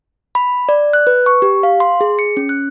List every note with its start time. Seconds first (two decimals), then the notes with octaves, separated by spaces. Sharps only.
0.35 B5
0.69 D5
0.93 F#6
1.07 B4
1.26 C#6
1.42 G4
1.63 F5
1.80 C6
2.01 G#4
2.19 C#7
2.37 C#4
2.49 F#6